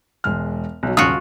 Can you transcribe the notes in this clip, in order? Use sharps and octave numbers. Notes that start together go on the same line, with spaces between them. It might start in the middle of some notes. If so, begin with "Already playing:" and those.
E1 G#3 F6
B1 F#3
D#1 C#3 F4 F#4 D#6